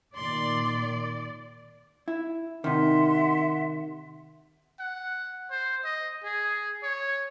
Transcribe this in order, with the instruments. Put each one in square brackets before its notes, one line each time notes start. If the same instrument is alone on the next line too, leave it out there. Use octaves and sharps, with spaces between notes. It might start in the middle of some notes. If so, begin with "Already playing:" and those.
[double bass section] A#2 D#3 [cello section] D5 [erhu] C6
[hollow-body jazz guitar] E4
[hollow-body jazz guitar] C3 D#3 [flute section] E5 F#5 C6
[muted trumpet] F#5
C5
D#5
G#4
C#5